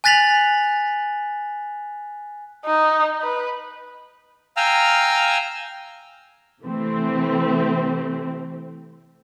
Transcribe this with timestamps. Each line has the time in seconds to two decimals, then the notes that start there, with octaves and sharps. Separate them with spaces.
0.04 G#5 F#6 A6 B6 F7 F#7
2.65 D#4
3.22 B4
4.57 F5 G5 G#5 A#5 E6 F6
6.62 C3 E3 A3 C4